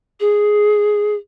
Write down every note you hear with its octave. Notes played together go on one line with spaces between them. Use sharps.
G#4